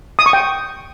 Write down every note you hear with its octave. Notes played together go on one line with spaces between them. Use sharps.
D#6
C#6
G5